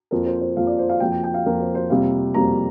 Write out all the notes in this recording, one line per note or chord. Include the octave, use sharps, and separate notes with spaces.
F2 F3 A#3 A#4
C5
C5
F2 F3 A#3 F5
D5
C5
F5
F2 F3 A#3 G5
G5
G5
F5
F2 F3 A#3 A#4
C5
C5
F2 C3 G3 A#3 F5
F2 C3 G3 A#3 A#5